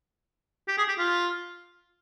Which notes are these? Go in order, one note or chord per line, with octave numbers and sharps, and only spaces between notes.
G4
G#4
G4
F4